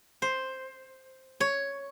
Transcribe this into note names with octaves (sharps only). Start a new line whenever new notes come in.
C5
C#5